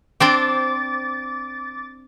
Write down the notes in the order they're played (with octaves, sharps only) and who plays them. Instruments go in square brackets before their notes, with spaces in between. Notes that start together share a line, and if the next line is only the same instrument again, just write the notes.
[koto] C4 D4 C5 [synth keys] D6 A6